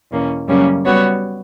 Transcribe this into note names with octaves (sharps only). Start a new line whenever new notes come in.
E2 B2 A#3 C#4
F#2 C#3 G3 A#3 C#4
G3 B3 F#4 C#5